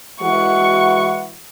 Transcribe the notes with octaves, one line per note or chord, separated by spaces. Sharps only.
E3 G#3 F#4 F#5 C#6